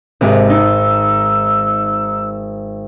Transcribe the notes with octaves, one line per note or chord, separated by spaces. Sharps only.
G#1 C3 G#3
D#4 E6